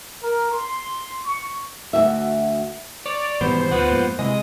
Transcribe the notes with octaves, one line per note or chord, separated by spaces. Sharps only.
A#4
C6
C#6
D2 A#2 F#4 E5
C#5 D5
G#1 G#2 B2 E3 G3 B3 C5
D2 B3 F4 F#5
F2 G#2 A#3
C3 E3 G#3 D#5